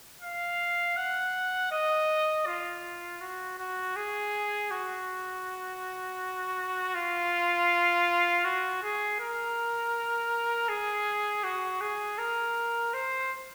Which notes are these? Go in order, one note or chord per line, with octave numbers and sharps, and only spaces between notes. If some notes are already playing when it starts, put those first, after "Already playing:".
F5
F#5
D#5
F4
F#4
F#4
G#4
F#4
F4
F#4
G#4
A#4
G#4
F#4
G#4
A#4
C5